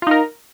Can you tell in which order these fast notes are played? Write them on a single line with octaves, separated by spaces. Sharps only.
F4 D#4 A#4